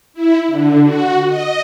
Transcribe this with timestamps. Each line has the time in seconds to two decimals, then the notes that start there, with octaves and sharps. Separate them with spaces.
0.14 E4
0.48 D3
0.83 F#4
1.27 D#5